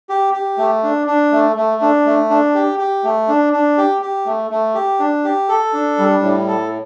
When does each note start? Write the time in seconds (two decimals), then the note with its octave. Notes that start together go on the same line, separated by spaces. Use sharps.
0.09 G4
0.33 G4
0.58 A3
0.83 D4
1.07 D4
1.32 A3
1.56 A3
1.81 D4
2.05 A3
2.30 D4
2.55 G4
2.79 G4
3.04 A3
3.28 D4
3.53 D4
3.78 G4
4.01 G4
4.26 A3
4.50 A3
4.75 G4
5.00 D4
5.24 G4
5.49 A4
5.73 D4
5.98 G3
6.22 A2
6.47 A4